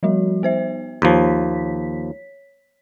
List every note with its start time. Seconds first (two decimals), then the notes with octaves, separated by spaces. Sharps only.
0.03 F3 G3 F#4
0.43 B3 C5 E5
1.02 D#2 F3 C#5 B6